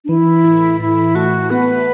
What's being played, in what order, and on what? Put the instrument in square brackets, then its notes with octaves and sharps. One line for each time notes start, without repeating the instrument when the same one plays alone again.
[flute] D4
[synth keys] E3 [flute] E4
[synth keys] A2
[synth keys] A2 [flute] E4
[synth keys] A3 [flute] F#4
[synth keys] B3 [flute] B4